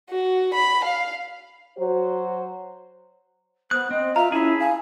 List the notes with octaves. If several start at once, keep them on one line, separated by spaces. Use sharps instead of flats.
F#4
B5
F5
F#3 F#4 C5
B3 C5 D#6 F#6
C4 D#5
F4 E5 F5 A#5
C#4 E4 G#4 A5 B5
F5 G#5